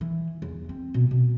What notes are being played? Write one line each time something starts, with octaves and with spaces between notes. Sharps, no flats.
E3
E2
C4
B2
B2